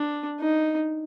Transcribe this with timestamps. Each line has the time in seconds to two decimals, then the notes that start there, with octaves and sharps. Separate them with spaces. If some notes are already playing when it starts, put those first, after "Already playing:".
Already playing: D4
0.40 D#4